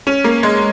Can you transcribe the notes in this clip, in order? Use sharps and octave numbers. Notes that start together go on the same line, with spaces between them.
C#4
A#3
G#3